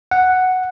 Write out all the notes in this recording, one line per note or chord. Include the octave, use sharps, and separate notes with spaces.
F#5